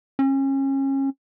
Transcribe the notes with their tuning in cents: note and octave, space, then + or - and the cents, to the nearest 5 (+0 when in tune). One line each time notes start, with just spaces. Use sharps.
C#4 -30